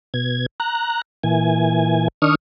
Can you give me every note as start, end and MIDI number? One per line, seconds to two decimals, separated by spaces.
0.14 0.46 47
0.14 0.46 92
0.60 1.02 82
0.60 1.02 90
1.23 2.08 46
1.23 2.08 52
1.23 2.08 80
2.22 2.35 51
2.22 2.35 62
2.22 2.35 85
2.22 2.35 87
2.22 2.35 89